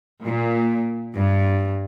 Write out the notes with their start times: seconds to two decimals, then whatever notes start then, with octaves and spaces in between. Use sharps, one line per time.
0.23 A#2
1.13 G2